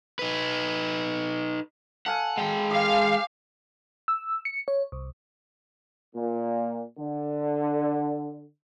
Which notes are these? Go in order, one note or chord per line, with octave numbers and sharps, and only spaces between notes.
D#4 B4
A4 F5 F#5 G#5
G#3 G5
G4 G#4 F5 G#5
E6
C#7
C#5
C2
A#2
D3